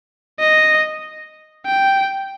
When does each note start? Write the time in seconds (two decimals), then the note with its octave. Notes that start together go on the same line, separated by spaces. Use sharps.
0.39 D#5
1.66 G5